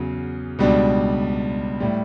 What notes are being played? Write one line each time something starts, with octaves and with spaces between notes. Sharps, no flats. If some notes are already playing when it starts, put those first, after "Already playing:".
Already playing: E2 C#3 F#3
C#2 B2 G3 D4
A2 G3